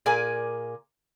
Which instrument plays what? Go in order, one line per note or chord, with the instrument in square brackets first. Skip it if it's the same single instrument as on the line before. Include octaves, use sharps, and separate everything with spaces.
[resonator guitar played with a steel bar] A#2 G#4 A#4 D5 G#5